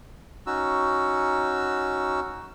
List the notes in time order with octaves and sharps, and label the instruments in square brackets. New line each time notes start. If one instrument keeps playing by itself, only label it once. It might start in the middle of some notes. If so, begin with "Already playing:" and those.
[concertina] C#4 D#4 F#4 E6